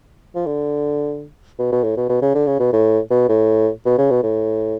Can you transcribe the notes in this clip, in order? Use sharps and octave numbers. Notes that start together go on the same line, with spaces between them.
F3
D3
B2
B2
A2
B2
B2
C#3
D3
C#3
B2
A2
B2
A2
B2
C#3
B2
A2